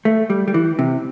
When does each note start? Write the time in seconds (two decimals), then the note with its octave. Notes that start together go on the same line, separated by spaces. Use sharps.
0.05 A3
0.30 G3
0.48 G3
0.54 E3
0.79 C3